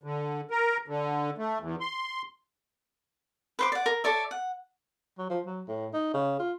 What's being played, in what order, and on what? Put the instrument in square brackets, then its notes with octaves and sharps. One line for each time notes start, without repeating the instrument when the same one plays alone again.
[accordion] D3
A#4
D3
A3
E2
C6
[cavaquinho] B4 C5 D6
D5 F#5
A#4
A4 C#5 D5 E5
F#5
[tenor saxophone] F#3
F3
F#3
A2
D#4
C#3
F4